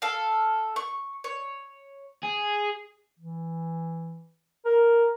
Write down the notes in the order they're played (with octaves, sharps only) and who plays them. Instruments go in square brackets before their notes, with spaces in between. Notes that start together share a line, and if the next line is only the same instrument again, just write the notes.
[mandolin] A4 F5
C#6
C#5
[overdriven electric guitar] G#4
[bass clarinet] E3
A#4